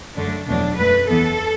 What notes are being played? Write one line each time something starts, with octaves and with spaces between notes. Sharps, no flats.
F#2 D3 A3 D4
E2 B2 F#3 A3 D4
F#2 F#3 A3 B4
E2 E3 B3 A4